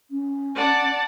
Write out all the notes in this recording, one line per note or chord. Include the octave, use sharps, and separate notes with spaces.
C#4
D5 F#5 A5